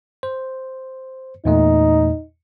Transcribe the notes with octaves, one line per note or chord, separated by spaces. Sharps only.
C5
E2 A#2 A3 D#4